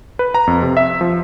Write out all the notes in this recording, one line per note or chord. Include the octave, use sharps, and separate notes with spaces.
B4
A#5
F2
C3
E5
F3